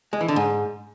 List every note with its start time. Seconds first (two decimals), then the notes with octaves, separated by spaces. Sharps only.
0.13 G#3
0.21 E3
0.28 D3
0.36 G#2